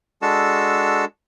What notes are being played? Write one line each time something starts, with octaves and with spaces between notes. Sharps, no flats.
G#3 D4 F#4 A4 E6